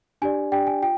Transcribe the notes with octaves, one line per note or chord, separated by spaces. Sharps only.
D4 G4 D5 G#5
D4 G4 D5 G5
G#5
F4 G5